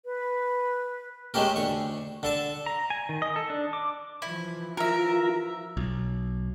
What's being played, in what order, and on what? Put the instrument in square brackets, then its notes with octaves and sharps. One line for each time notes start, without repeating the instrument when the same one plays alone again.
[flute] B4
[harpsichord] G#3 A3 C#4 G4 A#4
D2 C#6
D3 A4 A5
[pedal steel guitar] A#5
G#5
D#3
D#5
A4
D4
D6
[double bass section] E3 F3 [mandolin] E4
[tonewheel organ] F4 A#5 [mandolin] A#4 E5
[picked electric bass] B1